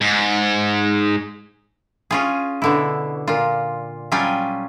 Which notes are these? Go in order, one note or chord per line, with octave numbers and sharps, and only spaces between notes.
G#2
C#4 F4 G#4
B2 D3 E4
A#2 F4
F#3 G3 C#4 F4 G5 G#5